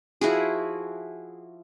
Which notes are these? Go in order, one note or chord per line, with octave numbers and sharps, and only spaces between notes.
F3 E4 F#4 G#4